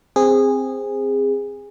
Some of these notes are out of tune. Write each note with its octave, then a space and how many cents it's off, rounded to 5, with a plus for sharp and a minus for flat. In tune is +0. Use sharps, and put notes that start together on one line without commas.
C4 +0 G#4 -20